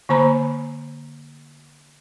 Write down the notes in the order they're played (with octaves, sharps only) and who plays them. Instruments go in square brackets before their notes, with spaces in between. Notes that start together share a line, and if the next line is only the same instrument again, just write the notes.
[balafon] D3 A#3 C5 A#5 B5